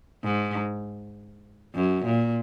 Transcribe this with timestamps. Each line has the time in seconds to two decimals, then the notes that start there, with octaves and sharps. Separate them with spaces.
0.23 G#2
1.75 F#2
2.05 A#2